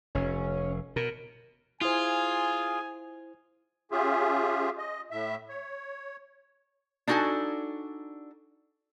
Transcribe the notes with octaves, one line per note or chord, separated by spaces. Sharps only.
F1 C#4
B2 A#4
E4 F4 G#4 C5 G#5
C#4 F4 G4 G#4 E5
D#5
A2 E5
C#5
D4 D#4 F#4 A4 G#5